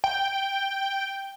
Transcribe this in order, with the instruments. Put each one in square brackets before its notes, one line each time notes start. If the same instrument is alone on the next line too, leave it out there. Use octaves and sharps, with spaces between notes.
[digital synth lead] G5